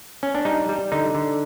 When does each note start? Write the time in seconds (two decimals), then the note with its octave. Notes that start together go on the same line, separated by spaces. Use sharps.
0.23 C#4
0.35 D4
0.45 G3 D#4
0.69 G3
0.92 D3 D#4
1.15 D3